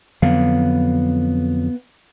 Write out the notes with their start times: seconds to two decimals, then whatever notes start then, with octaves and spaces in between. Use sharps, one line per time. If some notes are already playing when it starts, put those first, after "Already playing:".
0.22 F2 D3 F#3 B3 F5